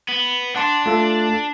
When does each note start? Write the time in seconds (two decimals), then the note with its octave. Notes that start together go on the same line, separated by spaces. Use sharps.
0.09 B3
0.56 D4 F#5 A5 C6
0.86 A3 F4 A4